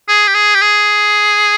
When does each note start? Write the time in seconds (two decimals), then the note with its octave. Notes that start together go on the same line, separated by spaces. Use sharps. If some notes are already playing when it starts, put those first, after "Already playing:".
0.08 G#4
0.28 G4
0.34 G#4
0.55 G4
0.62 G#4